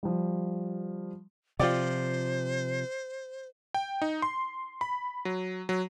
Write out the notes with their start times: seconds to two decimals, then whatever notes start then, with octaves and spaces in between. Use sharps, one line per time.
0.03 F3 G3
1.59 C3 F3 F4 G4 C5 D5
3.74 G5
4.02 D#4
4.22 C6
4.81 B5
5.25 F#3
5.69 F#3